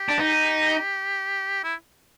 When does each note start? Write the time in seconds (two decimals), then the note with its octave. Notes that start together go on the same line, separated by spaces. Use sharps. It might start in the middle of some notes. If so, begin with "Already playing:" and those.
Already playing: G4
0.09 D4
0.19 D#4
1.64 E4